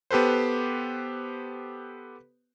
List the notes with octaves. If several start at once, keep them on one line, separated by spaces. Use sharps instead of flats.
B3 G4 A4 B4 C5